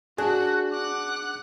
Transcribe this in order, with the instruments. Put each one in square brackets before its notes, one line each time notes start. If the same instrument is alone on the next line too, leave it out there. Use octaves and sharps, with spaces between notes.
[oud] D4 [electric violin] F#4 [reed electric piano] G#4 [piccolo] F#6
[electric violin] F#5 F#6 [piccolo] D6